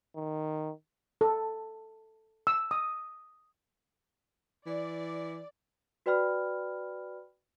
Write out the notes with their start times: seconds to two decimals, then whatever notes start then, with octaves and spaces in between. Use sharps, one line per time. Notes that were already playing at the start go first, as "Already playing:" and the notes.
0.16 D#3
1.21 A4
2.47 E6
2.71 D#6
4.67 E3 D5
6.06 F#4 B4 D5 G5 B5 F6